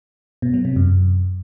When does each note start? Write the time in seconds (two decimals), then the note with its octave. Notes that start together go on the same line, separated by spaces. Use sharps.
0.42 B2
0.54 F#3
0.65 C3
0.76 F#2